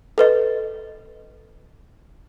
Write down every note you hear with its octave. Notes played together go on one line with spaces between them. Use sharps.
A4 B4 D#5